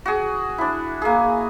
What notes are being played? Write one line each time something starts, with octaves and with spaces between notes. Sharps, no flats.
F#4 G#4
D4 E4
A#3 G#4